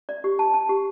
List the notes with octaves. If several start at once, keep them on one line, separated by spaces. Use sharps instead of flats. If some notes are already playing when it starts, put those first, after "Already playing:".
D5
G4
A5
A5
G4